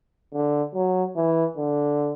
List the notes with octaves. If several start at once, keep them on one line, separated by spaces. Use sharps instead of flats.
D3
F#3
E3
D3